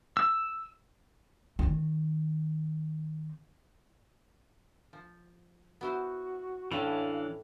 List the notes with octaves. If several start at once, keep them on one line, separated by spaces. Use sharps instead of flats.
E6
D#3 C4
F3
B3 E4 F#4 C5
A2 E3 A3 C#4 D4 F5